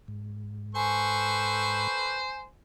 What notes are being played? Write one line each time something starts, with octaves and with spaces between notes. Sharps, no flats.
G#2
A4 B4 C5 G#5 C#6